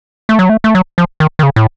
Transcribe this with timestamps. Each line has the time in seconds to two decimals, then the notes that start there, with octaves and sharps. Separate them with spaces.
0.29 A3
0.39 F#3
0.49 A3
0.64 A3
0.75 F#3
0.98 F3
1.20 D#3
1.39 D#3
1.43 C#3
1.56 A2